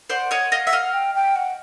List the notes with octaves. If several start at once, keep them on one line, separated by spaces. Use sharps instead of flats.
C5 D5 F#5
C#5 D#5
D#5 F5
E5
D#5 F5
G5
G5
F#5